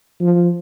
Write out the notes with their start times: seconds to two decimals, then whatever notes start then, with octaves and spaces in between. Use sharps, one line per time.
0.20 F3